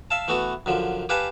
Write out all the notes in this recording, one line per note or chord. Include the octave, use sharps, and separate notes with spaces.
E5 F5 A5
E3 A3 B3 F#4 A4
F#2 D3 F3
G4 B4 F5 F#5 G#5 A5